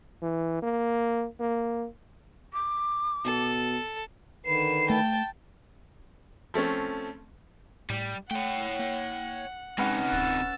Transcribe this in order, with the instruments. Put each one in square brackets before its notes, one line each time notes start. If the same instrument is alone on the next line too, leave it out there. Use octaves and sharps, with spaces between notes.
[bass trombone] E3
A#3
A#3
[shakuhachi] D6
[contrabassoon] B2 [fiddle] A4
[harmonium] D3 D#3 B4 [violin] C7 E7
[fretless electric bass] A3 [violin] G5 A5
[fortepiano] F3 A3 C4 C#4
[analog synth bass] A2 [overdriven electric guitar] G3
[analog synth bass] A3 [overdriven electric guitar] C#5 G5 [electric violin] F#5
[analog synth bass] A#3
[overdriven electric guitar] C3 D#4 [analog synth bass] G#3 [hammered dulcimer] C#4 B4 F#5
[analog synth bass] D1 [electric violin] E6 A6